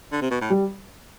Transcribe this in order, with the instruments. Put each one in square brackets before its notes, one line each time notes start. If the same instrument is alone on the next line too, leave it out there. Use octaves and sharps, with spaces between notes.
[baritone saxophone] D3
C3
B2
A2
[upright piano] G3